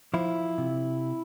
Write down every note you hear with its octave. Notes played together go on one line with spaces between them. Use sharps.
F3 E4
C3